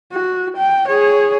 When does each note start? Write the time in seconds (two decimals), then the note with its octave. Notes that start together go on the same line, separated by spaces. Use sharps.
0.12 F#4
0.56 G5
0.88 G#4 C#5